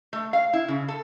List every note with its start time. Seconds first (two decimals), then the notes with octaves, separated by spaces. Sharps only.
0.13 A3
0.33 F5
0.53 E4
0.68 C#3
0.88 A4